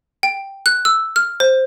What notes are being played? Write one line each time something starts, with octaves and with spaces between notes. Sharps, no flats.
G5
F#6
E6
F6
C5